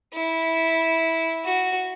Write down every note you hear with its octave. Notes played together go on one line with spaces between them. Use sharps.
E4
F#4